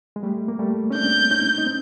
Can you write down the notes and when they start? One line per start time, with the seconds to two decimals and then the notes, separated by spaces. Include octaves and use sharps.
0.16 G#3
0.23 G3 A3
0.48 A#3
0.59 G3 A3
0.90 C#4
0.95 C4 D4 G6
1.31 C#4 D#4
1.58 D#4
1.66 C4